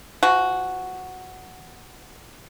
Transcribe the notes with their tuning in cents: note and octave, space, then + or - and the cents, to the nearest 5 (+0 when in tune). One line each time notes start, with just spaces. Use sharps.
F3 -35 F#4 +0